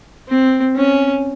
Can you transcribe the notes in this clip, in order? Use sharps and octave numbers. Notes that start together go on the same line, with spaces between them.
C4
C#4